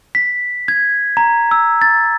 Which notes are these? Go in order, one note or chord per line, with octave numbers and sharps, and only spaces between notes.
B6
G#6
A#5
E6
A6